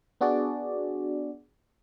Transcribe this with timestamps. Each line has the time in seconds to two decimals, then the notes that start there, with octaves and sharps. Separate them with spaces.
0.21 B3 D4 F#4 G#4 D5